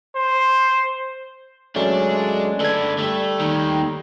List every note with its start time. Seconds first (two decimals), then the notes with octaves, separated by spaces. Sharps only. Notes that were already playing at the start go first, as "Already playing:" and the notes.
0.15 C5
1.76 F#3 G#3 A3 C#4 D4
2.60 D3 A4 B4 D5 G#6
2.98 G3 A3
3.39 D#2 D#3